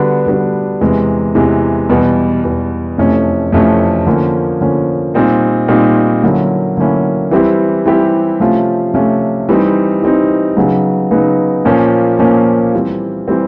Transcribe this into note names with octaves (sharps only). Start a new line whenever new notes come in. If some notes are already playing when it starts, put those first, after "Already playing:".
Already playing: D3 G3 B3 D4 F#4
D3 G3 B3 D4 F#4
E2 C3 E3 G#3
E2 C3 E3 G#3
E2 B2 G3
E2 B2 G3
F2 C3 E3 A3 C#4
F2 C3 E3 A3 C#4
D3 F3 A#3 C#4
D3 F3 A#3 C#4
A#2 G3 C4 D#4
A#2 G3 C4 D#4
D3 F#3 A#3 C#4 E4
D3 F#3 A#3 C#4 E4
E3 G3 C4 E4 G4
E3 G3 C4 E4 G4
C3 F3 A3 C#4 F4
C3 F3 A3 C#4 F4
E3 G3 C4 D#4
E3 G3 C4 D#4
C#3 F#3 B3 D#4
C#3 F#3 B3 D#4
A#2 F3 A#3 C#4
A#2 F3 A#3 C#4
E3 G3 C4
E3 G3 C4